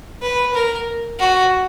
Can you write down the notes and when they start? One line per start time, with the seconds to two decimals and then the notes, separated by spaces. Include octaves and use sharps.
0.22 B4
0.54 A#4
1.20 F#4